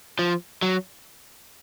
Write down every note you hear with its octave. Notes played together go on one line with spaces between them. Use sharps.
F3
F#3